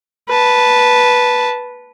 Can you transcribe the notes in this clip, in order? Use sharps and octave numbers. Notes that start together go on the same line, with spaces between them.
B4 A5